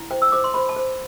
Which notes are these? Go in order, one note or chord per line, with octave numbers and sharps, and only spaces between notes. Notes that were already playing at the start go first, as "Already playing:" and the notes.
Already playing: E4
C5 G5
E6
C5 D6
C6
C5 B5
A5
C5